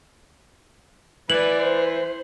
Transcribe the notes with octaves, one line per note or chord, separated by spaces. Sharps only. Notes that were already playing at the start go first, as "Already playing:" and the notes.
E3 B4 D5 F#7
C5